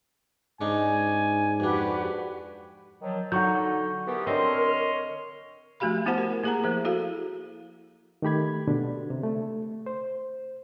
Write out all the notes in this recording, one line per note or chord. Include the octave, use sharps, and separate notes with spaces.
G#2 C#3 D4 D#4 G#5
F2 D4 F#4 G4 B4
D#3 F3 F#3
D3 F#3 D#4 F#5 C#6 G6
E3 B3 G4 A#4
D3 C4 C#5 D#5 C6
F3 A3 F#4 G4 F5 B5
B3 E4 G4 C5 F#5 A5
A#4
A#3 E4 G#4 A#4 F#5 A#5
F3 G#4 C5
E4 F#4 A4 F5
D#3 A3 G4 B5 G#6
B2 D3 D4
C3
A3
C5